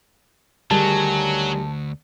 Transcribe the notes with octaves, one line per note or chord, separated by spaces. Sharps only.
D2 D#3 F#3 G3 G#4 A5